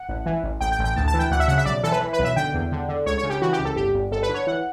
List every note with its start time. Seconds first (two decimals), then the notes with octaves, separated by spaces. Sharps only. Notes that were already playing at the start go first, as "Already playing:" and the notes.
Already playing: F#5
0.09 A1
0.26 E3
0.44 A1
0.61 A1 G5
0.72 G5
0.79 A1
0.84 G5
0.96 D2 A5
1.08 A5
1.14 E3
1.19 G5
1.31 D2 F#5
1.40 E5
1.48 C#3 F#5
1.58 E5
1.66 B1 D5
1.83 E3 A4
1.92 B4
2.01 E3
2.13 B4
2.19 B1
2.24 E5
2.36 D3 G5
2.54 E2
2.72 D3
2.89 D3
3.06 C#2 C#5
3.18 C#5
3.23 C#3
3.30 G4
3.42 E3 F#4
3.53 G4
3.59 C#2
3.65 A4
3.76 G1 G4
3.94 G1
4.11 G1 A4
4.23 B4
4.29 D3
4.34 C#5
4.47 E3 F#5